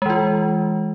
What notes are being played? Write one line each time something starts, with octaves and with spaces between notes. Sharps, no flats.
E3 G#3 F4